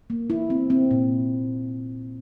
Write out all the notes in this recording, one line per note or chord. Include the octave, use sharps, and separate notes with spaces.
A#3
E4
C4
C4
A#2